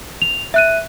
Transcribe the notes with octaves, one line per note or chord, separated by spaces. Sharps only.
F7
E5 F#6 D#7